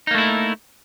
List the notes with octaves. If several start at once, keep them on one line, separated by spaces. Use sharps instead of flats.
A3 A#3 D#4 E4